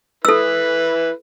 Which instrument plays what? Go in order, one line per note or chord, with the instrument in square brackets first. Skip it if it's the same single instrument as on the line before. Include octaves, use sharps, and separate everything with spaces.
[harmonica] E4 B4 [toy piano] A4 E6